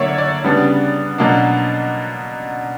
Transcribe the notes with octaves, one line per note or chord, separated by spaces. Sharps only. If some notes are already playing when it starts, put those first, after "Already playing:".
Already playing: D3 F#3 A#3 C#5 D5 E5
D5
C#3 G3 B3 D4
B2 F#3 A#3 D4